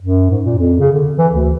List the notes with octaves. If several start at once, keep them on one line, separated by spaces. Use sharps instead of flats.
F#2
G#2
A#2
F2
C#3
D3
E3
D2